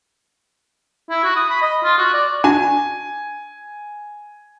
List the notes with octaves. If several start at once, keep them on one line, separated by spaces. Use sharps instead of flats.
E4
F#4
D#6
B5
D#5
F4
F#4
D5
D4 F#4 G#5